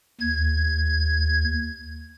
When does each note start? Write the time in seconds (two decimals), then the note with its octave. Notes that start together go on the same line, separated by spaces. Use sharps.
0.21 D#2 G#6